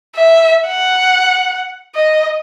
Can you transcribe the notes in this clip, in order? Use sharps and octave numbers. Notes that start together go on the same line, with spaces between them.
E5
F#5
D#5